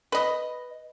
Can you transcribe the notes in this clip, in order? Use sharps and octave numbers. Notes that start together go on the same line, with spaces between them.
B4 D#5